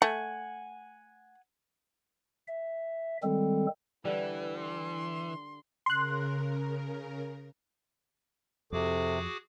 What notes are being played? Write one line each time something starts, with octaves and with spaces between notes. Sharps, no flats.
A3 F#5 G#5
E5
D#3 G3 G#3 C4 A4
D3 E3 G3 B4
C6
C#3 A#4 C6 F#6
F2 C3 F#4 G#4 A4 D6